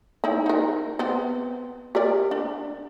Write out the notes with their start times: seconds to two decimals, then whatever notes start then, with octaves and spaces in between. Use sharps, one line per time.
0.24 D#4 E4
0.46 D#4 A#4
0.99 B3 C4
1.95 G4 A#4 D5
2.31 D4